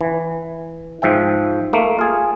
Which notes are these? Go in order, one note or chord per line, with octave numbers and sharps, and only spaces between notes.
E3
G#2 F3 E5 G5
A3 A#3
F4 G#4